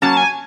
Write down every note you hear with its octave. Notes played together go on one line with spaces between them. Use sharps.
F#3 A#3 C#4 A5
G#5